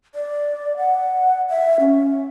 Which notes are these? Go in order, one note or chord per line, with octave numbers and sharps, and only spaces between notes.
D5
F#5
E5
C#4